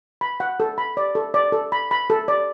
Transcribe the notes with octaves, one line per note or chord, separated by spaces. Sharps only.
B5
F#5
A4
B5
D5
A4
D5
A4
B5
B5
A4
D5